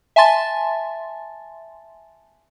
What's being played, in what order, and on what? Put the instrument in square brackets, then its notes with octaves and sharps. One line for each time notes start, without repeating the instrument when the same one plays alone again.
[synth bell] E5 G#5 A5 C6 A6